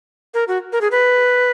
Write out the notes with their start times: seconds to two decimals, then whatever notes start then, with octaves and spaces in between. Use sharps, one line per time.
0.34 A#4
0.48 F#4
0.72 A#4
0.81 G#4
0.91 B4